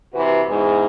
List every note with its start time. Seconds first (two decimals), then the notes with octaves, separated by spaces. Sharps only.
0.14 C3 E3 F#4 B4
0.48 E2 G#2